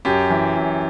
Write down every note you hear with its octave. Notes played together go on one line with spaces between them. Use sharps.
F#2 G4
E3
F#2